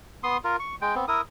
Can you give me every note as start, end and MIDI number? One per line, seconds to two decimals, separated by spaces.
0.24 0.37 59
0.24 0.37 84
0.24 0.37 87
0.44 0.56 65
0.44 0.56 70
0.60 0.75 85
0.81 0.95 56
0.81 0.95 79
0.95 1.05 59
0.95 1.05 60
1.08 1.21 64
1.08 1.21 70
1.08 1.21 87